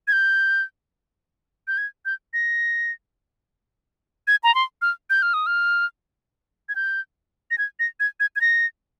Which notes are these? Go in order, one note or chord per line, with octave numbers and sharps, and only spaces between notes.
G#6
G6
G6
G#6
G6
A#6
G#6
A#5
C6
F6
G6
F6
D#6
F6
G#6
G6
A#6
G#6
A#6
G#6
G#6
G#6
A#6